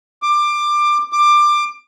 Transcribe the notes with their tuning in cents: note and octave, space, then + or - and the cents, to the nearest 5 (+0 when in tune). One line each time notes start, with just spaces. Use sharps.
D6 +20
D6 +20